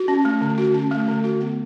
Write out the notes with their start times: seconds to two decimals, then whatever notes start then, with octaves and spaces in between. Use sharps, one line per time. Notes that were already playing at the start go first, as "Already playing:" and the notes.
Already playing: F#4
0.08 C#4
0.25 A3
0.41 D3
0.58 F#4
0.74 C#4
0.91 A3
1.08 D3
1.24 F#4
1.40 B3